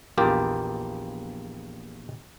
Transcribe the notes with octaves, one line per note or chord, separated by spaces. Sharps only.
A#1 E2 A#3 F4 G4